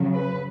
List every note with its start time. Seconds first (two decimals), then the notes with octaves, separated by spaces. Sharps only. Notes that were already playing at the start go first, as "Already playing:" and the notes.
Already playing: C#3 F#3
0.14 B4